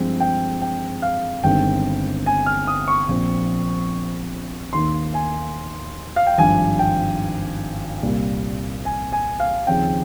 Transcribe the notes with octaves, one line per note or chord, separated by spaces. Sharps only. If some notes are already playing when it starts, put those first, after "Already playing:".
Already playing: G2 F3 G#3 C4
G5
G5
F5
G1 G2 D#3 G#3 C4 G5
G#5
F6
D#6
C#6
A#1 A#2 F3 C4
D#2 D#3 A#3 C6
G#5
F5
G5
G#1 G2 F3 G#5
G5
C2 A#2 G3 A#3
G#5
G#5
F5
D#2 C#3 F3 C4 G5